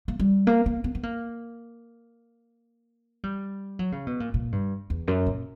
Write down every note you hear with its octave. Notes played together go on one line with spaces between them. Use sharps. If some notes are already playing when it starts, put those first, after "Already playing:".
A#3
G3
A#3
A#3
B3
B3
A#3
G3
F#3
C#3
B2
A#2
A#2
G2
E2
F#2
A#2